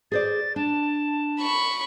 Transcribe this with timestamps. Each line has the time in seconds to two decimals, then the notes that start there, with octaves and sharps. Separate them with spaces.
0.12 G#4 C5 D5 A6
0.56 D4 A5
1.40 B5 C#6